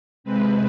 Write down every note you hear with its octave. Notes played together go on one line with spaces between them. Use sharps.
C3 G#3 C4 B4